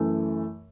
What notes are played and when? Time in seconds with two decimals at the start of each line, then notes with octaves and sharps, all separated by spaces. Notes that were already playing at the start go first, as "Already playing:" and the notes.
Already playing: F#2 E3 A3